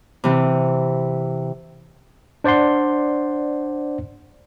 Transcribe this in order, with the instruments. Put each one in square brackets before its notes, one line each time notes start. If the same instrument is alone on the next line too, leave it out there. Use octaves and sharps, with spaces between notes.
[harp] C3 E3 C4
[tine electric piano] D4 C5 D5 F#5 C6